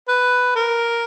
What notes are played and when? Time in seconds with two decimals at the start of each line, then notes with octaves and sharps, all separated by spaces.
0.08 B4
0.56 A#4